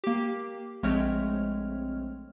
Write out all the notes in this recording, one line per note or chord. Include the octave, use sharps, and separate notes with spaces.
A#3 G4
A#1 G#3 A3 C4 C#5 F6